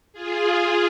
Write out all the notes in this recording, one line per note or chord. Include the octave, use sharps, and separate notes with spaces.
F4 G#4